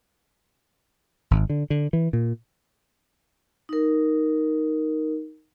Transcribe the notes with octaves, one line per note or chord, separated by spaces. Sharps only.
G#1
D3
D3
E3
A#2
D#4 A#4